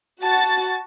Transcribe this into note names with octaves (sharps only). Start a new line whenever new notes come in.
F#4 A5 A6